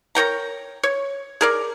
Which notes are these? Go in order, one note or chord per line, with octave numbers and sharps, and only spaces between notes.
A#4 C#5 G5 A#5
C#5
G#4 A#4 D5